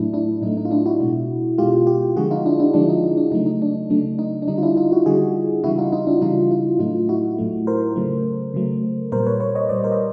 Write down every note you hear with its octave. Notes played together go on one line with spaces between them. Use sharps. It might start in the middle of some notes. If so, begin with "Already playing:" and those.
Already playing: A2 F#3 A3 D4 E4
D4 E4
A2 F#3 A3 D#4
D#4
F4
D4 E4
E4 F#4
B2 G#3
B2 G#3 F4 G4
F4 G4
D3 F3 G#3 F#4 G#4
D#4 F4
D4 E4
D4 E4
D3 F3 G#3 D4
D#4
D#4
D4
C#3 F#3 A3 D#4
D#4
D4
C#3 F#3 A3 D4
D#4
D4
D3 G3 D#4
F4
D4 E4
D#4 F4
E4 F#4
D3 G3 F#4 G#4
C#3 E3 G3 E4 F#4
D#4 F4
D#4 F4
D4 E4
C#3 E3 G3 D#4 F4
D#4 F4
A2 F#3 A3 D#4 F4
E4 F#4
A2 F#3 A3
A#4 C5
C#3 F#3 A3
C#3 F#3 A3
A#2 G3 A#4 C5
B4 C#5
B4 C#5
C#5 D#5
A#2 G3 C5 D5
A#4 C5
D#5